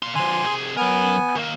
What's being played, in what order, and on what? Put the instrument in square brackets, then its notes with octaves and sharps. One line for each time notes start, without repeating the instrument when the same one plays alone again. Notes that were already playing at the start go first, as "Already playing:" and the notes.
[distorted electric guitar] A#3 C6
[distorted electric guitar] D3 F3 [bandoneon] G#5 C6
[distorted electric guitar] C2 G#4
[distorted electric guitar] F#3 A#4 [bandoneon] B3 G#5
[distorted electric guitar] D#3 A#3